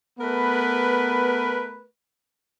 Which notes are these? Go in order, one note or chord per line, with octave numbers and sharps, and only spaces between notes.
A3 B3 A#4 B4